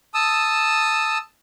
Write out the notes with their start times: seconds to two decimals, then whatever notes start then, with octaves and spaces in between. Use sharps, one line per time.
0.14 A5 D#6 E6